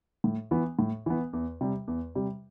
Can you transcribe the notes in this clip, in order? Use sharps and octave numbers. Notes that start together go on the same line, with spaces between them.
A2
E3 B3
A2
E3 B3
E2
C3 G3
E2
C3 G3